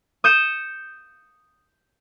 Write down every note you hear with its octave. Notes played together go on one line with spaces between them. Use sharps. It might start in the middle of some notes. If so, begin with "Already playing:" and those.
D#6 G6 C#7 E7